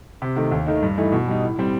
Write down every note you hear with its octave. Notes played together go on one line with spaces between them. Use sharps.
C3
D#3 A3
D#2
D#3 A3 D#4
G2
E3 A3 D#4
B2
G3 D#4
A2
G3 C4